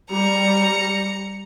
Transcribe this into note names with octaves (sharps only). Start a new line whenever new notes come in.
G3 A#5 C#7